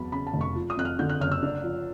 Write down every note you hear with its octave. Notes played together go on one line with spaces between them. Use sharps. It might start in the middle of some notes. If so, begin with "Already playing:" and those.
Already playing: E2 F#3 A5 B5
C#3 B5
A5
F1
C#6
F3
D#6
F2 F#6
F6
D3 G6
F#6
F#1 F6
E6
D4
F3